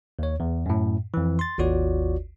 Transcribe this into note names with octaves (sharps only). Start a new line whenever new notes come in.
D#2 C#5
E2
F#2 A2
F2 E3
C6 A6
G#1 D#2 F4 F#4 C#5 D5